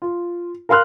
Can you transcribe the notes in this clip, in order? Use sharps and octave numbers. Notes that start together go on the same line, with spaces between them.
F4
A#4 F5 C6 F6 F#6